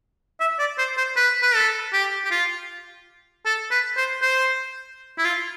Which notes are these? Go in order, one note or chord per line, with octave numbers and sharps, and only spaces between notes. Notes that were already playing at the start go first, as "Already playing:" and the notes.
E5
D5
C5
C5
B4
B4
A4
G4
G4
F4
A4
B4
C5
C5
E4
F4